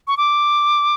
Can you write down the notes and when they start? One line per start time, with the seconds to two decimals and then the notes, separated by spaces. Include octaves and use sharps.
0.08 C#6
0.17 D6